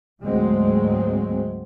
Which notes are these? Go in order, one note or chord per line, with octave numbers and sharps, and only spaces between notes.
D2 G#2 F#3 G#3 A#3 C4